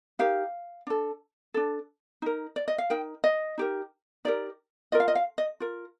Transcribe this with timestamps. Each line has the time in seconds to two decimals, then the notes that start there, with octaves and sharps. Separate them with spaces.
0.19 D#4 G4 A#4 F5
0.87 D4 A4
1.54 D4 A4
2.22 D#4 A#4
2.56 D5
2.68 D#5
2.78 F5
2.90 D#4 A#4 G5
3.24 D#5
3.58 D#4 G4 A#4
4.25 D#4 G4 A#4 D5
4.92 F4 A#4 D#5
5.00 F5
5.08 D#5
5.15 F5
5.38 D#5
5.60 F4 A#4